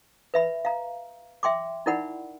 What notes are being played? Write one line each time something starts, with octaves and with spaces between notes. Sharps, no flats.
B4 E5 B5
F5 A#5
E5 G5 C6 D6
D#4 E4 A#4 D5 F#5 B5